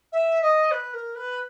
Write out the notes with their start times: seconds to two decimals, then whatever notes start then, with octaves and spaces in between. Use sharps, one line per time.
0.12 E5
0.42 D#5
0.71 B4
0.93 A#4
1.15 B4